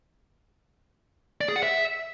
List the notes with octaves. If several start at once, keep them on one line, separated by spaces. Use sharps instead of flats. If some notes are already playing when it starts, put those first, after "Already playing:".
D5
G#4
F#5
E5